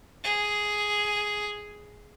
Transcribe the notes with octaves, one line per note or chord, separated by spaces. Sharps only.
G#4